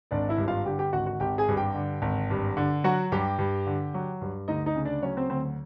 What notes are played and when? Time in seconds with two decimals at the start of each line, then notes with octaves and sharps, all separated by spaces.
0.11 G#1 D4 D5
0.29 E4 E5
0.38 G2
0.48 F4 F5
0.66 D3 G4 G5
0.79 G4 G5
0.93 G#1 F#4 F#5
1.06 F#4 F#5
1.20 G#1 G4 G5
1.38 G#4 G#5
1.48 G2
1.57 G4 G5
1.75 D3
2.02 G#1
2.30 G2
2.57 D3
2.84 F#3 F#4 F#5
3.12 G2 G4 G5
3.39 G2
3.66 D3
3.94 F#3
4.21 G2
4.48 D2 D#4 D#5
4.66 D#4 D#5
4.76 C#3
4.85 D4 D5
5.02 F#3 C#4 C#5
5.17 C4 C5
5.30 D2 C4 C5